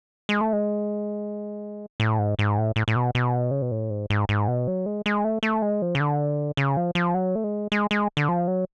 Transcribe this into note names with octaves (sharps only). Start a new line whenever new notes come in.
G#3
A3
G#3
A2
G#2
G#2
A2
A2
A2
B2
B2
C#3
B2
A2
G#2
G#2
G#2
B2
F#3
G#3
G#3
A3
A3
G#3
F3
C#3
D3
C#3
F3
F3
F#3
A3
G#3
G#3
G#3
D3
F3
F#3